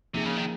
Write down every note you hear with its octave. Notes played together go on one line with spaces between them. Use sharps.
C3 F3 A#3 D#4 G#4
C#3
D#3